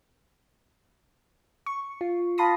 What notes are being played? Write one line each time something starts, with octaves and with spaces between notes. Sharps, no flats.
C#6
F4
F5 A5 B5 C6 D#6 A#6